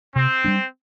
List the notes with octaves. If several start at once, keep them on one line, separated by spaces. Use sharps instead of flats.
C3 C4
G3 A#3 D4